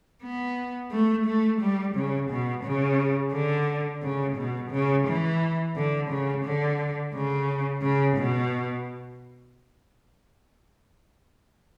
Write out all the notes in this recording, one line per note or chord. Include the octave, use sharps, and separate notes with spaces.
B3
A3
A3
G3
C#3
B2
C#3
D3
C#3
B2
C#3
E3
D3
C#3
D3
C#3
C#3
B2